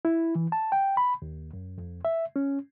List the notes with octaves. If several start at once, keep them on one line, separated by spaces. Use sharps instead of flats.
E4
E3
A5
G5
B5
D#2
F#2
F2
E5
C#4